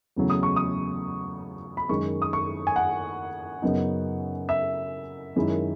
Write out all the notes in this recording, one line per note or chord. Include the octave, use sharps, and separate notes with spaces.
E2 C#3 F#3 A3
D#6
C#6
D#6
B5
F#2 D#3 G#3 C#6
D#6
C#6
G#5
F#5
F#2 C#3 F#3 B3 D#4
E5
F#2 D#3 G#3 C#4 E4